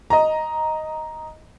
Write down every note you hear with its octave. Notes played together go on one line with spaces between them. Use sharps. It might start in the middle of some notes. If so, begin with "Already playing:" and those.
D#5 A#5